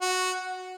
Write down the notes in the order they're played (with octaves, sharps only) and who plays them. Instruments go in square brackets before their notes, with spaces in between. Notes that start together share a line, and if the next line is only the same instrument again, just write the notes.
[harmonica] F#4